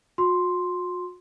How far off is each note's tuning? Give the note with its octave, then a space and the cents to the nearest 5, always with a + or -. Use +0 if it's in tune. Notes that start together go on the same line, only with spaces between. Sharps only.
F#4 -45 C6 +0